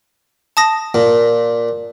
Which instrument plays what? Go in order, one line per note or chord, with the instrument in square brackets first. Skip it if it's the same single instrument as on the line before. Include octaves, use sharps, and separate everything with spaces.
[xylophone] A5 D#6 A#6
[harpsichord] A#2